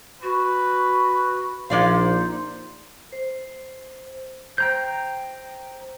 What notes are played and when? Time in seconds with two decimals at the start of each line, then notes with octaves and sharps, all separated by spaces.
0.23 F#4 B4
1.70 A#1 A#3 D#4 C5 D5 F5
3.12 C5
4.58 C5 G5 A#5 G6